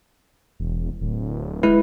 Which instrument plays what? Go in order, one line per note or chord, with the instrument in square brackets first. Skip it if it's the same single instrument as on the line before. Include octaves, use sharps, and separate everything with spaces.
[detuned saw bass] E1
D1
[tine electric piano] G#3 E4 B4